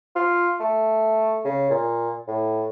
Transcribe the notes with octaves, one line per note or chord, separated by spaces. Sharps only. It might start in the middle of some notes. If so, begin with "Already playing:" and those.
F4
A3
C#3
A#2
A2